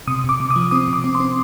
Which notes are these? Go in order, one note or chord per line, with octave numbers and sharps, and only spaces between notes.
C3 D#6
C3 D6
C3
D#6
F3
C4 D#6
C3
D6
C4
C6
C4